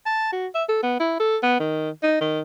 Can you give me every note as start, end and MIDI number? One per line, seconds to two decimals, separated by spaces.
0.06 0.31 81
0.33 0.47 66
0.55 0.64 76
0.69 0.82 69
0.83 0.96 59
1.00 1.15 64
1.20 1.37 69
1.43 1.59 59
1.60 1.90 51
2.03 2.20 63
2.21 2.42 51